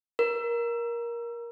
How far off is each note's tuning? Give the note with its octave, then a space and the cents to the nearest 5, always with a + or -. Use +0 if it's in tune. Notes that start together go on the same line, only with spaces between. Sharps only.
A#4 +15